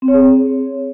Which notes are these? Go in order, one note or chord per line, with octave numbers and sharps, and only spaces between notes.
C4
C#5
G#4